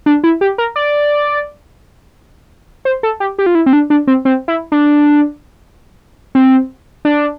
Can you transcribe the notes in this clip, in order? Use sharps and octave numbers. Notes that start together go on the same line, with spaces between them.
D4
E4
G4
A#4
D5
C5
A4
G4
G4
F4
E4
C4
D4
D4
C4
C4
E4
D4
C4
D4